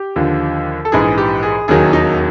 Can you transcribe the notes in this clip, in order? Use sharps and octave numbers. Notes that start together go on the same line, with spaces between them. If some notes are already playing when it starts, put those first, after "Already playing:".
Already playing: G4
D#2 D3 F3
A4
A#1 G#2 E3 G#4
G4
G#4
E1 D#2 D#3 F#3 G#4
D#4